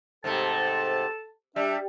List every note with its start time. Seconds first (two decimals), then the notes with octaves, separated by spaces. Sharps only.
0.24 G#2 C3 A3 A4 A5
1.56 G3 D4 E5